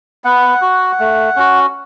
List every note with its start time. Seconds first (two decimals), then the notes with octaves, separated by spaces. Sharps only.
0.24 B3 F#5
0.62 F#4
1.00 A3
1.36 C#4 F#4